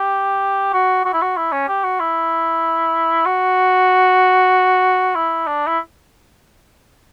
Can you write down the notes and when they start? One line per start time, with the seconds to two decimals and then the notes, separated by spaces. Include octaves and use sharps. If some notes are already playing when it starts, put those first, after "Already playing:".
Already playing: G4
0.74 F#4
1.05 F#4
1.13 E4
1.22 F#4
1.37 E4
1.52 C#4
1.68 G4
1.84 F#4
2.00 E4
3.26 F#4
5.15 E4
5.47 D4
5.67 E4